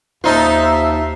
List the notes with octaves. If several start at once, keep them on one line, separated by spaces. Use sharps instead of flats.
D#2 D#4 F4 C5 E5 A5